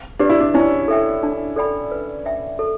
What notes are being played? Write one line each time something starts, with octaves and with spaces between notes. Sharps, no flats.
D4 G4 B4 D5
E4
D4
C#4 E4
A4 E5 G5
D4
A4 D5 G5 B5
B4
E5 G5
A4